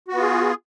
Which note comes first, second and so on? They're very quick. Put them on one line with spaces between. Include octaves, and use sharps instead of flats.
F#4 B3 F4 G#4